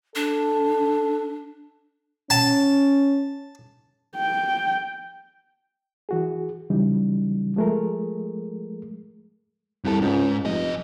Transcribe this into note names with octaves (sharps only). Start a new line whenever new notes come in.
D4 A4
C#4 A5
G5
E3 F#4 G#4
C#3 E3 F#3 G3 D#4
F3 G#3 A3 G#4 A#4
C2 F#2 A4
C#2 G#2
F1 F#2 D#5